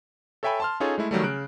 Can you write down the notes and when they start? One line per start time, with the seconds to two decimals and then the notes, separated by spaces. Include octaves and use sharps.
0.43 A4 C#5 E5 G5 G#5 B5
0.60 A5 C6 F6
0.80 C#4 D#4 F4 G#4 A4 C#5
0.98 G#3 A3 E4
1.11 D#3 F#3 G3 A3
1.23 C#3 F#6 D7